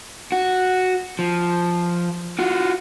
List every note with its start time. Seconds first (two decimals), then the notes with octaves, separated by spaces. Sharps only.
0.32 F#4
1.19 F3
2.39 F4 F#4